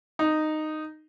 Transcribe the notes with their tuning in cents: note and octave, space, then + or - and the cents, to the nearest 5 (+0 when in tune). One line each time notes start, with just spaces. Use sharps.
D#4 -10